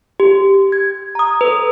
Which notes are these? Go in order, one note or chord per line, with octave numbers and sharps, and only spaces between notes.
G4
G#6
A#5 D#6
A4 B4